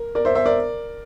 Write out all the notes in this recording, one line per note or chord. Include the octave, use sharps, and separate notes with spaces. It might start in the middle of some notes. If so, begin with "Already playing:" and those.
Already playing: A#4
A#4 D5
C5 E5
C5 E5
A#4 D5